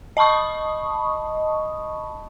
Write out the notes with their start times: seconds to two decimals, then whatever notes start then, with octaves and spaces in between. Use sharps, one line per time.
0.17 D#5 A5 B5 C#6 D#6